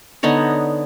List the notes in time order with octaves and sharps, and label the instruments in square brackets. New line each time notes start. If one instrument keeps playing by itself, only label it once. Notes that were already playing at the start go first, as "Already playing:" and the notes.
[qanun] D3 B3 D#4 C#5